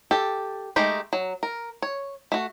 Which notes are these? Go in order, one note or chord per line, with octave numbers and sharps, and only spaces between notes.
G4 A4
G#3 A3 D#4 G4
F#3
A#4
C#5
A3 F#4